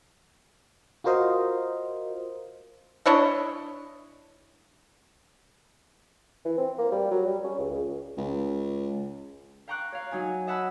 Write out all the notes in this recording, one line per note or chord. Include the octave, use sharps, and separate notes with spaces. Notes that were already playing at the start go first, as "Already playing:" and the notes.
F4 F#4 A#4 C5 D#5 F5
D4 E4 C#5 D#5
E3
C4
A#3
G3
F#3
G3
C#4
C#2
C#2
C#2
F5 G5 A#5 C#6 D6 F#6
C#5 F5
F#3 D#4 G#5
D#5 E5 F#5 A5 B5 E6